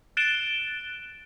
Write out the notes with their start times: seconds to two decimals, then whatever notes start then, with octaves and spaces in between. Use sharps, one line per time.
0.17 F#6 A6 D7 E7 G7